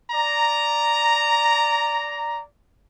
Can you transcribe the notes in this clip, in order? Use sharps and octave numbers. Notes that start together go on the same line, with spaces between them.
D5 A#5